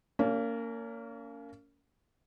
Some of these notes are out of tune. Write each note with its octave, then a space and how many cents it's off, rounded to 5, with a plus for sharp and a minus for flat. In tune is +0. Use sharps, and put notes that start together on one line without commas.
A#3 -20 C#4 +35